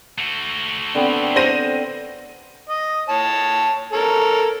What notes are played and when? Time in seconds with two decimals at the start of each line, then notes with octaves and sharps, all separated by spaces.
0.18 A3 F#4
0.95 D3 B3 C4
1.36 C5 A#6 D#7
2.70 D#5
3.09 C#5 A5
3.93 A4 A#4 C#5